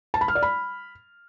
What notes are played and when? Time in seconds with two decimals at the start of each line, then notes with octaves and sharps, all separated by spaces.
0.14 A5
0.21 B5
0.28 F6
0.35 D5
0.43 B5